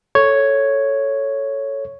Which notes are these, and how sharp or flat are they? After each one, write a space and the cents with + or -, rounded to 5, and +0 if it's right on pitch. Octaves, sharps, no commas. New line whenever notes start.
A4 +0 C#5 +0